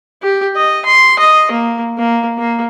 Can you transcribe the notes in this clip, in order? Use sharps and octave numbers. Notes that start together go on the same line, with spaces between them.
G4
D#5
C6
D#5
A#3
A#3
A#3